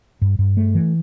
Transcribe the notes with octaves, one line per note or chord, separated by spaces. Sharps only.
G2
G2
A3
E3